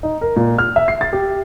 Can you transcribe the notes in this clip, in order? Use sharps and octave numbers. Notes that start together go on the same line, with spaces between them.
D#4
A#4
A#2
F6
E5
C7
A6
G4